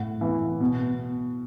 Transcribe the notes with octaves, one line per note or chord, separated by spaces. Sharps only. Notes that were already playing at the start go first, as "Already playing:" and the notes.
Already playing: A2 F#5
E3
B2